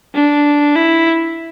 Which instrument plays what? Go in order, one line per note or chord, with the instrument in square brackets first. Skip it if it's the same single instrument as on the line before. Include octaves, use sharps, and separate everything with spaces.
[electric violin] D4
E4